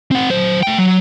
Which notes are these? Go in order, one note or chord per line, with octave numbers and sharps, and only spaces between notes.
C4 F#5
F#3 C5
A3 G5
F#3